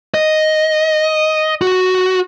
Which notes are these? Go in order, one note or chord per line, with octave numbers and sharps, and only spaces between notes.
D#5
F#4